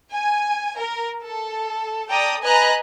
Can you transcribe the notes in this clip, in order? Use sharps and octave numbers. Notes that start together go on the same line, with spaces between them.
G#5
A#4
A4
A4 D5 G5 A#5 D#6
B4 D#5 G#5 A#5 F#6